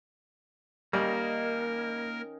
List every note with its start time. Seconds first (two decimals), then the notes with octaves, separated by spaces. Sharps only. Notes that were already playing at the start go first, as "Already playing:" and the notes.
0.93 D#3 G3 A#3 C#4 D#4 A#4